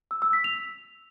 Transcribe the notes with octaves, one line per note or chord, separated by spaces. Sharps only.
E6
E6
B6
F7